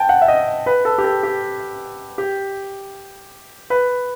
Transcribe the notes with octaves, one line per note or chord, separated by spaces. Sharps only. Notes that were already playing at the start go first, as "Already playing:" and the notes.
Already playing: G5 A5
F#5
E5
D#5
B4
A4
G4
A4
G4
G4
B4